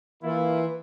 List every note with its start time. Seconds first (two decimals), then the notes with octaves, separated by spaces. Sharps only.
0.23 E3 A#3 E4 F4